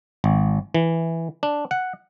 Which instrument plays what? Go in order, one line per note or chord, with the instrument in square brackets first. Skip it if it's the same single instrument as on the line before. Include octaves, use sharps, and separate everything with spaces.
[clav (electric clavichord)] G#1
E3
D4
F#5